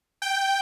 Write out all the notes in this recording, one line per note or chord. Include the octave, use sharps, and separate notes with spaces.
G5